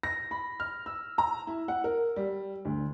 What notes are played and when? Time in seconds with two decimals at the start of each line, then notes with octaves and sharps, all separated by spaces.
0.03 A#6
0.31 B5
0.60 F6
0.86 E6
1.18 A#5
1.47 E4
1.68 F#5
1.84 A#4
2.16 G3
2.65 D2